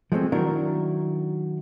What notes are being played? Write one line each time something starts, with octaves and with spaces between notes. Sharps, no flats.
F3 G#3 A3 C4
D#3 F#3 D4 E4 A#4